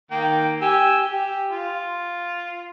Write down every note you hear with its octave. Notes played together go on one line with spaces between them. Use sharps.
D#3 A#3 G5
G4 G#5 E6
G4
F4